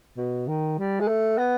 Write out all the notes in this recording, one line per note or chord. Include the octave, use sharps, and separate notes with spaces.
B2
D#3
G3
G#3
A3
B3